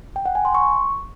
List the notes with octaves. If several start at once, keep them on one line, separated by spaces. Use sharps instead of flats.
G5
F#5
G#5
C6
C#6